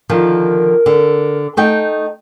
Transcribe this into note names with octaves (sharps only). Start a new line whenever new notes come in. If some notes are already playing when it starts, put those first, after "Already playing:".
D3 D#3 F3 A#4
D3
A3 D#4 G5